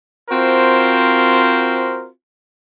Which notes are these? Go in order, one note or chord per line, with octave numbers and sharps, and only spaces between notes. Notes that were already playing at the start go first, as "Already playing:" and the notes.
C4 F4 F#4 A#4 C5